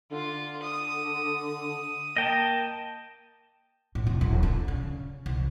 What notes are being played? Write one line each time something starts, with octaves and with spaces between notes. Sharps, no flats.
D3 F4
D#6
A#3 D#5 G5 A5
A2
E1
D1
D3
C#3
C2